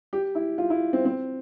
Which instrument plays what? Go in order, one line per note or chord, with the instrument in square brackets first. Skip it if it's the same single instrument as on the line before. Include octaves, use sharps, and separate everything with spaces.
[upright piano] G4
E4
F4
E4
C4
C4